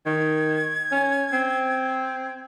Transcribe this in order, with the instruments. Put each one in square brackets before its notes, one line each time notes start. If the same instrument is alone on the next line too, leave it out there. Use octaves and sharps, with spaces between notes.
[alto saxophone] D#3 [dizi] G#6
[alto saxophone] C#4
C4